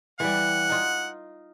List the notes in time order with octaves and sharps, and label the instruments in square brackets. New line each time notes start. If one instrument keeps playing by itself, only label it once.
[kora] E3 G3 [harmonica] F#5
[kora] D#4 F4